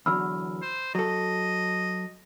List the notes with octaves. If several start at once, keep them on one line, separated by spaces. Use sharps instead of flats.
E2 D3 F#3 B5 E6 F6
C5
F#3 A4 D#5